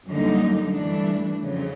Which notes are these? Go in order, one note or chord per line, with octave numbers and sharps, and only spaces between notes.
F#2 D3 G3 A#3 D#4
G2 E3 A3 D4
F2 C#3 F#3